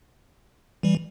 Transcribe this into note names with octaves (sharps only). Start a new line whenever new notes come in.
E3 G3